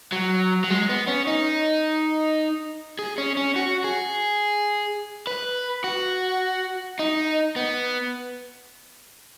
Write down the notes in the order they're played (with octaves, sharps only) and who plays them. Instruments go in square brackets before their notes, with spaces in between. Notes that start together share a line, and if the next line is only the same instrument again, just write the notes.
[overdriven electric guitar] F#3
F#3
G#3
B3
C#4
D#4
G#4
C#4
C#4
F#4
G#4
B4
F#4
D#4
B3